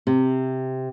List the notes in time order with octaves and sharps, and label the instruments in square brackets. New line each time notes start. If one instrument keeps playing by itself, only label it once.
[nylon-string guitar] C3